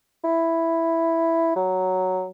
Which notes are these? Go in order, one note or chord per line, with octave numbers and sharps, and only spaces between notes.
E4
F#3